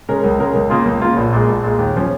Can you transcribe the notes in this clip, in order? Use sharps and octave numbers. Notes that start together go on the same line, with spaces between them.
C#3 G#3 C#4 A#4
C#2
C#3 G#3 C#4 A#4
C#2
C#3 A#3 F4
C#2
C#3 A#3 F4
A#1
A#2 G#3
A#1
A#2 G#3
D#2
C#3 F3 C#4